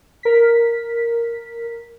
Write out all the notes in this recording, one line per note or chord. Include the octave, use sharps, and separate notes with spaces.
A#4 B6